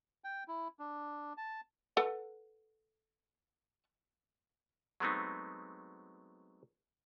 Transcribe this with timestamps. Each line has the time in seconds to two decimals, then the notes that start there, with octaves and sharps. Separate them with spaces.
0.24 G5
0.48 E4
0.79 D4
1.37 A5
1.97 A4 B4 F#5
5.00 F#3 G#3 A3 B3 C4 D#4